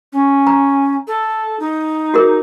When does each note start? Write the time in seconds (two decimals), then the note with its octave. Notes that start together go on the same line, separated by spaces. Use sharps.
0.13 C#4
0.47 A#5
1.07 A4
1.60 D#4
2.14 F#4 G#4 A#4